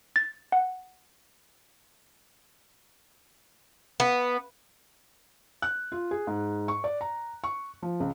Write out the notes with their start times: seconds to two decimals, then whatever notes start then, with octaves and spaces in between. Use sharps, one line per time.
0.16 A6
0.52 F#5
4.00 B3
5.62 F#6
5.92 F4
6.11 G#4
6.27 G#2
6.68 C#6
6.84 D5
7.01 A#5
7.44 C#6
7.83 F3
8.00 C#2